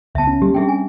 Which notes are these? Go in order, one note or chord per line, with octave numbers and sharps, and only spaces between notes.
C#2 B3 E5 A5
C#4
F#3 G3 A#3 G4
G3 C4 D4 G#4 E5 G5
G#5